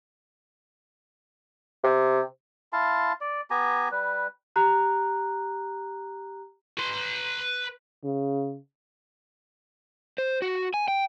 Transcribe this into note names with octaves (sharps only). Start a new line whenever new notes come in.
C3
E4 F5 A5 C6
D5
B3 G4 G#5 A#5
G3 B4
G4 A#5 F#6
B4 C6
C#3
C5
F#4
G#5
G5